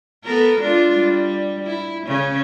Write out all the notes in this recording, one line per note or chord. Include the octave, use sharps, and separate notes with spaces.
B3 A4 A#4
G#3 D4 F4
G3
E4
C#3 C#4